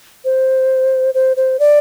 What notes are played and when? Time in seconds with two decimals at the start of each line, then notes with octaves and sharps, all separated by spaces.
0.25 C5
1.14 C5
1.37 C5
1.59 D5